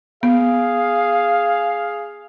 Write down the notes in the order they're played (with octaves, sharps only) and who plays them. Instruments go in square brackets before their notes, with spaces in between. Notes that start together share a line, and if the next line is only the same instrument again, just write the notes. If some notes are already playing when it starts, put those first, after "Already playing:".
[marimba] B3 [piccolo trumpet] G#4 [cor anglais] F5